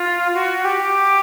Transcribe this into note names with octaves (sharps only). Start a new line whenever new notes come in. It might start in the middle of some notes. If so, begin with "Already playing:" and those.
Already playing: F4
F#4
G4